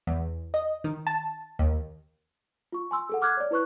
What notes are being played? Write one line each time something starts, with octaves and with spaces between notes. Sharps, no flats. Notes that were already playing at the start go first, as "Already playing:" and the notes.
E2
D#5
D#3
A5
D#2
F4 C#6
G#5 C6 E6
G#4 A4 F#5
D6 F6 F#6 G#6
C#5 D5
E4 B4 C#6 F#6